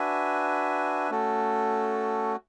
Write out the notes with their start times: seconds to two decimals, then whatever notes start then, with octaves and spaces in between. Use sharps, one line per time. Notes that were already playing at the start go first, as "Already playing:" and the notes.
Already playing: D4 F#4 B4 E5 G#5
1.10 A3 C#4 F#4 A4